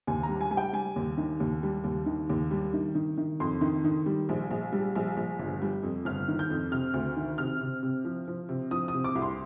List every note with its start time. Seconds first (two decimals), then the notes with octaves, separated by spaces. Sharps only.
0.07 D#2 G#5
0.23 A#5
0.29 G3
0.41 G#5
0.51 G3 G#5
0.57 G5
0.73 G3 G#5
0.96 D#2
1.18 D#3
1.40 D#2
1.63 G3
1.84 D#2
2.06 D#3
2.29 D#2
2.51 G3
2.74 D#3
2.95 D#3
3.18 D#3
3.40 F2 C6
3.61 D#3
3.84 D#3
4.06 G3
4.29 A#1
4.51 A#1
4.72 G3
4.95 A#1
5.17 A#1
5.39 G1
5.62 G3
5.83 F2
6.05 G1 F6
6.28 D#3
6.39 G6
6.50 F2
6.71 C3 F6
6.94 D2
7.16 D#3
7.38 C3 F6
7.61 C3
7.83 C3
8.05 F3
8.28 F3
8.49 C3
8.71 F3 D#6
8.88 D#6
8.94 C3
9.04 D6
9.16 C2
9.22 C6